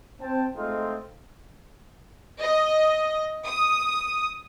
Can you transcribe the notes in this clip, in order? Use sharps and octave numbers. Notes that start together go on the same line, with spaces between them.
C4 G5 A5
G#3 A3 C4 D#4 F4
D#5
D#6